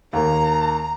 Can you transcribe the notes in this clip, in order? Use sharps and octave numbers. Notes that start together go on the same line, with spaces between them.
D#2 A#3 A#5